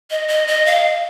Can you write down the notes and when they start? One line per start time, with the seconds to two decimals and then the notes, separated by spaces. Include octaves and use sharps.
0.11 D#5
0.28 D#5
0.47 D#5
0.66 F5